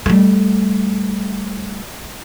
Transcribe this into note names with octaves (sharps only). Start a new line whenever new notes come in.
G3 A3